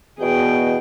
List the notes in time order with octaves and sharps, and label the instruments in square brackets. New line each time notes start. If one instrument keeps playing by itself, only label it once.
[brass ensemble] E2 B2 [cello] G#4 G5